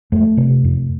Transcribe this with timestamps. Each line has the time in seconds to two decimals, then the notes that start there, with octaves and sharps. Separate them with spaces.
0.12 F2 A3
0.37 C3
0.64 F2